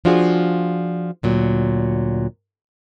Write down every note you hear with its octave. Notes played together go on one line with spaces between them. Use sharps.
F3 D4 F4 F#4 G#4
D2 A#2 F#3